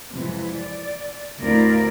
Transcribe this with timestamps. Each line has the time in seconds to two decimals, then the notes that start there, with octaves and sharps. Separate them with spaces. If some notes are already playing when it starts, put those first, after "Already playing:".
0.12 F2 G#2 C3 E3 F3
0.54 D5
1.40 D2 C4 E4 A#4 D5 F5